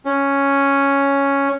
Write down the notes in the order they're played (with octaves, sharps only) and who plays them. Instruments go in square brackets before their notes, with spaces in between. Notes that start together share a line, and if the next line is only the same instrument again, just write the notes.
[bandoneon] C#4